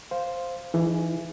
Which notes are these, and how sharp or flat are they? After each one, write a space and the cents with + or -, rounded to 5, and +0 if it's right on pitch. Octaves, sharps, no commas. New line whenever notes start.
C5 +0 F5 +0
E3 +25 D#4 +0 G#4 +0